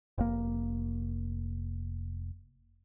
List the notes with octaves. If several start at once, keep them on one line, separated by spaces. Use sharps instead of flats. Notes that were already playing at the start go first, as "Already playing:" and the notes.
F1 A#3